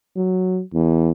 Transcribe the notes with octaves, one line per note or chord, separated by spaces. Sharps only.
F#3
E2